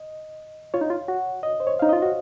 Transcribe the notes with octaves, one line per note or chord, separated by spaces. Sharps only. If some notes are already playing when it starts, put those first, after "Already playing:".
Already playing: D#5
F4 C#5
D#4
F4
F#4
D#5
C5
C#5
D#4 F5
F4 D#5
F#4